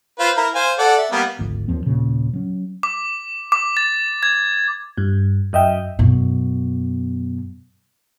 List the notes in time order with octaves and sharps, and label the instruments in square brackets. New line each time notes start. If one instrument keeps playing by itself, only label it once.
[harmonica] F4 B4 C5
E4 A#4
C5 F5 G#5
A4 D5 F#5
E5
G3 A#3 B3
[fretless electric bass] G#1 D2 F3
D#2 F3 C4
D#1 A#2 C#3
F#3 C#4
[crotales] D6
D6
A6
G#6
[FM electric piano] G2
F#2 D#5 E5 G5
[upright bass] F#2 B2